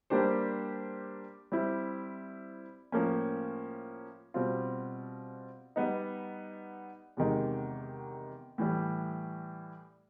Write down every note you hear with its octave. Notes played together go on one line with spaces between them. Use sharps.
G3 A#3 D4 G4 C5
G3 C4 E4
A2 F3 A#3 C#4
B2 G3 C4 F4
G3 B3 D#4
E2 C3 D#3 G#3
A2 E3 G3